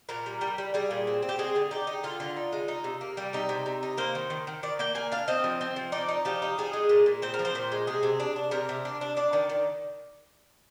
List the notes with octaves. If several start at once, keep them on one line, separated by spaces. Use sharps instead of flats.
A#2 A#4
G3
G3
G3
G3 G#4
A#2
C4
C4
G4
G#3 G#4
D3
D#4 G4
D#4
D3 F4
D3
D#4
G#3
D#4
C3
A#3
G3
C3 D#4
C3
C3
D#4
A#3 C5
D#3
D#3
D#3
D#3 D5
A#3 G5
A#3 G#5
D4 F5
C4 D#5
F3
C4
F3
D#4 D5
D#4
F3 G4
D#4
F3 G#4
G#3
A#2
A#2
C4 C5
A#4
F3
C5
A#2
G#3
C3 G#4
C3
D4
D4
C3 A#4
C3
D4
D4
D4 D5
D#3
D#3